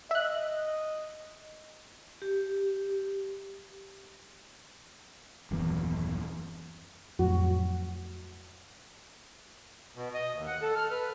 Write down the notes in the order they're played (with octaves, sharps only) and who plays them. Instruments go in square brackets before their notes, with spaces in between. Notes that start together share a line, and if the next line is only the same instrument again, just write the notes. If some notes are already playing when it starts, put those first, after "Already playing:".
[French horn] D#5 [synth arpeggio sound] E5 F#6
[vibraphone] G4
[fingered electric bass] D#1 F#2 E3 B3
[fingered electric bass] F2 A2 F#3 [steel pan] F#4
[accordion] B2
D#5
D#2
F#5
A4
F6
B4